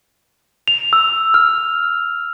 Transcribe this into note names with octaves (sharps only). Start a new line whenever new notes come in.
F7
E6
F6